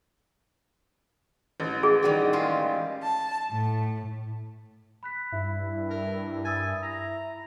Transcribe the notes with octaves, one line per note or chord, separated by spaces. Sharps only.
A1
G#4
D#3 G3 F#4
G#3 F4 G4
A5
A2
B5 F#6 B6
G2 E4
A#4
G#5 D#6 E6 A6
A#5 A#6